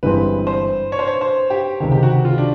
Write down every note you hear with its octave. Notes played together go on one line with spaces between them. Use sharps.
G1 G2 E3 G#3 C4 B4
C5
C#5
C5
C#5
C5
G4
C#2 C3 D#3 G4
G4
F#4
F4
D4